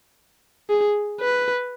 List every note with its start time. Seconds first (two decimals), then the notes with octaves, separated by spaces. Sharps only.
0.70 G#4
1.21 B4